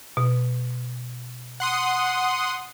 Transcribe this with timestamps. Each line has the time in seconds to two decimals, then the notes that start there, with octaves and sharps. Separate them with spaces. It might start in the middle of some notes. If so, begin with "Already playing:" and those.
0.17 B2
1.60 F#5 C6 D#6